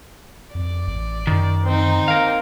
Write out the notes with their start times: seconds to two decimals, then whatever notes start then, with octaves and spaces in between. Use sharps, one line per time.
0.55 F2 D5
0.87 A1
1.27 F#2 D#3
1.65 C4 D#4
2.08 A#4 F5